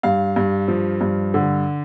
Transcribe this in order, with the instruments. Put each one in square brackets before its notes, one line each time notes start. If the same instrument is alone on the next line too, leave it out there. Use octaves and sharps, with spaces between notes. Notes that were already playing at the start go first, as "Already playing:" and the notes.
[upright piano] G2 F5
G2
F3
G2
D3